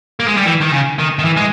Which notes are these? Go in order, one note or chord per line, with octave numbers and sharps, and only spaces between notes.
A#3
G#3
G3
E3
D#3
C#3
D#3
D#3
E3
G#3